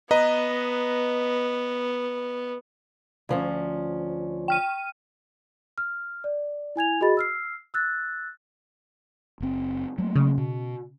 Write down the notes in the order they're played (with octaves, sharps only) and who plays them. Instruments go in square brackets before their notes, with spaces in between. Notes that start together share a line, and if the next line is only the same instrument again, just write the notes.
[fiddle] B3 [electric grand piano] B4 D#5 A#5
[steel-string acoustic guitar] D2 F3 C#4
[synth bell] G5 F6 D#7
[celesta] F6
D5
E4 G#5 G#6 F7
F#4 G#4 D#5 B5 A6
E6 F6 C7
E6 F#6 A6
[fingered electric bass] F#1 C4
F#3 A3 A#3
[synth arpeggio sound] C#3
[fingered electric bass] B2